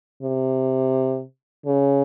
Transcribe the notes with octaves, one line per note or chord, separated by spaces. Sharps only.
C3
C#3